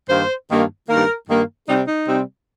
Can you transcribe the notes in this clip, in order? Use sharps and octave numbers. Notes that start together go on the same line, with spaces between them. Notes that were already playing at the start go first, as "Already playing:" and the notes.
G2 D#3 A#3 C5
G2 D#3 A#3
G2 D#3 A#3 A#4
G2 D#3 A#3
C3 G3 C4 D#4
D#4
C3 G3 C4